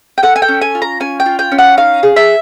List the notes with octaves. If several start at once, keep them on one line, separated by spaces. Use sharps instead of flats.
G5
A4 F#5
G#5
G5
C#4
G#5
F4
A#5
C#4 G#5
G5
F4
G5
C#4
F#5
D#4 F5
G#4
E5